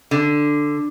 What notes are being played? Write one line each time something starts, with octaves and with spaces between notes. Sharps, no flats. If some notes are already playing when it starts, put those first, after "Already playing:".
D3